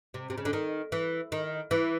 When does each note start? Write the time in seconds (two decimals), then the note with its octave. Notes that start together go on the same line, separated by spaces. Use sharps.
0.14 C3
0.30 C3
0.38 C#3
0.45 D3
0.53 D#3
0.92 E3
1.32 D#3
1.71 E3